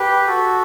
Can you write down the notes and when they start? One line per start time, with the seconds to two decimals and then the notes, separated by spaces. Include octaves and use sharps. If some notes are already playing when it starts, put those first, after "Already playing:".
Already playing: G4 B4
0.27 F#4 A4